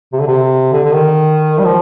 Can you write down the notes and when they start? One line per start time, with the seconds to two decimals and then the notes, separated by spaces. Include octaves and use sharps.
0.13 C3
0.20 D3
0.27 C3
0.72 D3
0.84 D3
0.93 D#3
1.58 G3
1.64 F3